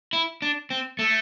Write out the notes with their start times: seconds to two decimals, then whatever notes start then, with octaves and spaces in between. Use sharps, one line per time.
0.13 E4
0.42 D4
0.70 C4
0.99 A3